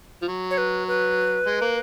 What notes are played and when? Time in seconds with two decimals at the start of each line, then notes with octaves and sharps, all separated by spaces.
0.22 F3
0.28 F#3
0.51 C#5
0.58 B4
0.88 B4
1.47 G#3
1.62 A#3